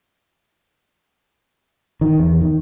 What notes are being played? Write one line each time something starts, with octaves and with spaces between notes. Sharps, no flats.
D#3
E2
D#3